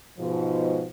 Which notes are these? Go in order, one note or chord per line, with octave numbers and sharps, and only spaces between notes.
G#2 B2 F3